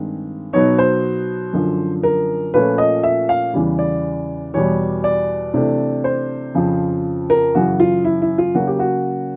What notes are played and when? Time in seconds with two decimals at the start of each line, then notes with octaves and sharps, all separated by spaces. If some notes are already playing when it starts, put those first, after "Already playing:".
Already playing: G2 D#3 G#3 C4
0.53 B2 F#3 B3 D#4 C#5
0.79 C5
1.53 F#2 D3 F3
2.03 A#4
2.54 A#2 F3 A3 C#4 B4
2.78 D#5
3.03 E5
3.29 F5
3.54 E2 C#3 E3 G3
3.79 D5
4.54 E2 B2 G3 C#5
5.04 D5
5.54 C3 E3 A3 D4
6.04 C5
6.55 F2 C#3 F3
7.30 A#4
7.55 F#2 C#3 E3 F#4
7.80 F4
8.05 E4
8.22 E4
8.38 F4
8.55 C#3 F#3 A#3 C#4 F#4
8.67 G4
8.79 F#4